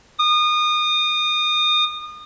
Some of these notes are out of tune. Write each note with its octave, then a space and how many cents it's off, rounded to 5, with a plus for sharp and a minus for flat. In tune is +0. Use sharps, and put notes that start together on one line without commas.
D#6 -30